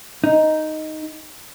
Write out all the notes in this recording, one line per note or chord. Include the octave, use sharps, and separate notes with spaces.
D#4